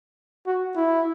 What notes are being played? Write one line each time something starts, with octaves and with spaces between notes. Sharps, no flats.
F#4
E4